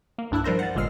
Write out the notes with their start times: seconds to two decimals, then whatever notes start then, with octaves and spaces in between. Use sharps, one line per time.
0.18 A#3
0.31 B1 G2 D4 E4 E6 F#6
0.44 F3 G3 A#4 C5 A#6
0.59 F#5 A6
0.75 G1 A#2 G#3 E6 F6 C7